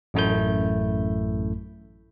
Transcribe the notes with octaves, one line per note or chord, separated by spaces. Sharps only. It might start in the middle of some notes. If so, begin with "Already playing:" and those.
A1 F#2 A3 E4 G6